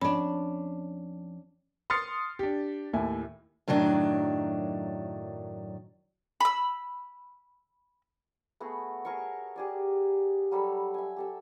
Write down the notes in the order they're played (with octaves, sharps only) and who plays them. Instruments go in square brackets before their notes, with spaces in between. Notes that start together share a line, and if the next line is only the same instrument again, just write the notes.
[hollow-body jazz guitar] F2 [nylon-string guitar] C#4 D4 [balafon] B5
[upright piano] C6 D#6 F6 A6 C7 C#7
D4 G4
D#2 A2 E4 G#5
[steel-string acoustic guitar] F#2 A2 D#3 F#3 D4
[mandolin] B5 E6
[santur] A3 B3 F#4 G#4
G#4 A#4 C#5 C#6
G4 G#4 D5
F#3 G3 A4 B5
E5 G#5
G4 A4 E5